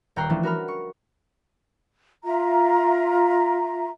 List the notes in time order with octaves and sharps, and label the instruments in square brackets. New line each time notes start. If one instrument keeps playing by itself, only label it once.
[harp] D#1 C#5 G5 A#5 F#6 C7
E3 F3 A3 C#4 D4
F#4 A#4 B5 F6
C#6
[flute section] F4 E5 A#5